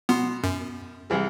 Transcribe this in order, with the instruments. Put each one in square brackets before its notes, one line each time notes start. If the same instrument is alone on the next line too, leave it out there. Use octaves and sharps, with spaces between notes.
[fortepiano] B2 C6 [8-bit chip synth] B3
[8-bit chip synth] F#2
[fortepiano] C2 E3 G#3